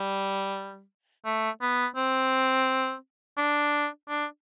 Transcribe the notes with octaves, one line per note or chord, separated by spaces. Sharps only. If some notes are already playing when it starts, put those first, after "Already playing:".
Already playing: G3
A3
B3
C4
D4
D4